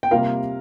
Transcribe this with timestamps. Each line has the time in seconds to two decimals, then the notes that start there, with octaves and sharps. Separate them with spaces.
0.03 G5
0.11 C3 G3 A#3 F4 A#4 F5